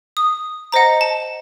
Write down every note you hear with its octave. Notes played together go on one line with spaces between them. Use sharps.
D#6
C5 D#5 F#5 A#5
A5